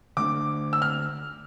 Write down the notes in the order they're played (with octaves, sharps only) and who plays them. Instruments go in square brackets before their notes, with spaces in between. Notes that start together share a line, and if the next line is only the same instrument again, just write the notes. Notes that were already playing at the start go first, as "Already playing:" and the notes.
[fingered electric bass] D3 A3 D4 [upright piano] D6
[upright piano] E6
F6